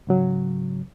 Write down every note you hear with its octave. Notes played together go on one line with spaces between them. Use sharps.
G#2 C#3 F#3